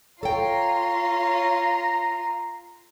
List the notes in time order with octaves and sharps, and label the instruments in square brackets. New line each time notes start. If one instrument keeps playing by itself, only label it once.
[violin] F4 C6 [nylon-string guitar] A4 G5 [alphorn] C#5 [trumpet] A#5